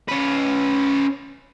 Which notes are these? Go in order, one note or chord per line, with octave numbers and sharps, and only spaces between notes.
C#4 B4